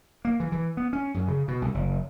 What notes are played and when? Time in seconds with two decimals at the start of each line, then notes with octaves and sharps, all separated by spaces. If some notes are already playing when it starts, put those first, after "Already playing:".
0.25 A#3
0.40 E3
0.52 E3
0.77 B3
0.93 C#4
1.14 F#2
1.28 C#3
1.48 B2
1.62 C2
1.74 F#1